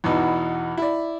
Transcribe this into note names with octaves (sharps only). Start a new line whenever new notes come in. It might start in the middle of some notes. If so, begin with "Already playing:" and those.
E2 B2 E3 D#4
E4 D5